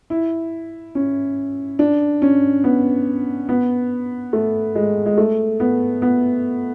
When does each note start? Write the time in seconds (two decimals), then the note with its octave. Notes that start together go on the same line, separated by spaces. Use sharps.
0.10 E4
0.95 C#4
1.79 D4
2.22 C#4
2.64 B3
3.49 B3
4.33 A3
4.75 G#3
5.06 G#3
5.18 A3
5.60 B3
6.02 B3